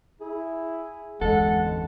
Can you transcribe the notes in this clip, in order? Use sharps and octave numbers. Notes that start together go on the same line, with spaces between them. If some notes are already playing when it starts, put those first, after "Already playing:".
E4 G#4
G1 E2 G#3 A4 F#5